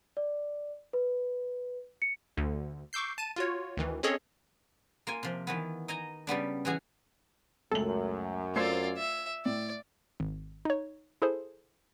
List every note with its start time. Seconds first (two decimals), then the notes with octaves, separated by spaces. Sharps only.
0.17 D5
0.93 B4
2.02 C#7
2.37 D2 D3
2.93 C#6 D6 E6 G6 C7
3.18 A5 D#7
3.36 F4 F#4 C#5
3.77 D2 D#3 E3
4.03 C4 C#4 G#4 A4 C#5 D#5
5.07 A#3 F4 G#5
5.23 C3 F3
5.47 D#3 E3 B3
5.88 D#4 D#5 G#5 A#5
6.27 C#3 G3 B3 D4
6.65 E3 C#4 F#4 G#4
7.72 C#2 F#2 A3 A4 F#7
8.56 A3 F4 C5 D5 E6 G#6 C7
8.98 E5
9.46 A2 D5
10.20 G#1
10.65 D#4 C#5
11.22 E4 G#4 A4 C5